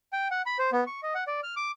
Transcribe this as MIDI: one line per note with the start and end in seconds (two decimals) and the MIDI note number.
0.13 0.28 79
0.31 0.42 78
0.46 0.58 83
0.59 0.70 72
0.73 0.84 59
0.87 1.01 85
1.03 1.14 75
1.15 1.24 78
1.27 1.40 74
1.43 1.55 89
1.56 1.71 86